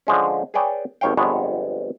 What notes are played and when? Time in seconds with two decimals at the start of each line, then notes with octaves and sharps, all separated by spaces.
0.07 D3 F3 G#3 C#4
0.54 G#4 B4 C#5 D5 G5 G#5
1.01 G#1 D#2 C#5 F5 G5
1.17 G1 F2 G#3 B3 C#5 A5